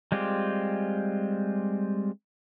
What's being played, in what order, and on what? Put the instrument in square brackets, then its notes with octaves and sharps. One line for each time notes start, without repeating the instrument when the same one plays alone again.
[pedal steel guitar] G3 G#3 C4 F4 G4